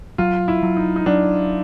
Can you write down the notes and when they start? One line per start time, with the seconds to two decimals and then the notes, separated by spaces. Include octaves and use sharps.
0.18 F#3 F4
0.48 E4
0.63 F#3
0.77 D#4
0.96 D#4
1.06 F#3 D4